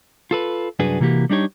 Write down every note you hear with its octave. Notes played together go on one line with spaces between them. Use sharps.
F4 A4 B4
C2 F#2 D4 F#4 G#4 B4
C3 E3 A#3 F#4 G4
G3 D4 D#4 G4 C#5